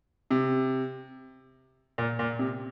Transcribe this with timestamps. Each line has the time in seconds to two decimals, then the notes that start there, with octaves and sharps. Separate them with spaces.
0.31 C3
1.98 A#2
2.19 A#2
2.39 C3